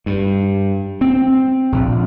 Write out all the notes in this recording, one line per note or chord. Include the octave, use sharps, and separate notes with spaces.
G2
C4
A#1